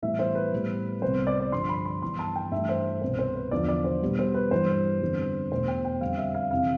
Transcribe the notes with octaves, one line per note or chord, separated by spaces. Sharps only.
A2 E3 G3 B3 E5
C5
B4
A2 G3 B3
C2 C3 G3 B3 C5
D5
D5
G2 D3 F3 C6
B5
C6
G2 E3 B3 C6
A5
G5
G2 E3 A3 E5
C5
C2 B2 B3 C5
C5
B4
E2 D3 F3 B3 D5
D5
C5
B2 G3 B3
C5
B4
G2 E3 G3 C5
F2 D3 G3 B3
E2 B2 A3 C5
G5
G5
F2 D3 G3 F5
E5
F5
F2 C3 E3 F5